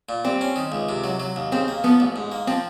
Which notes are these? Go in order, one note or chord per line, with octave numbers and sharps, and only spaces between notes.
A#2
G3 C4
C#4
D#3
C#2
C3
F#3
F#3
D#2
C#3 C4
A#3
F3 B3
A1
G#2
A#3
F3 C4